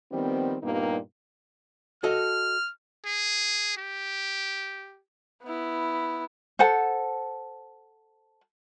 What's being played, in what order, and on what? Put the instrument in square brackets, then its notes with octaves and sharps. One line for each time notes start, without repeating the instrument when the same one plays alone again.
[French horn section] D#3 F3 G3 B3 C4
G2 A#2 G3 A#3 B3 D#4
[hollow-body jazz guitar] F#4 A4 D#5 [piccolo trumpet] F6
[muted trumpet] G#4
G4
[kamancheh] B3 E4
[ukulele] A4 C5 F#5 A5